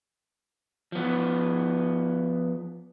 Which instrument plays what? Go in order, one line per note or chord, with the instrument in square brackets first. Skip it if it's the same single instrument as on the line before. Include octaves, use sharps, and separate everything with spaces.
[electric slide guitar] F3 B3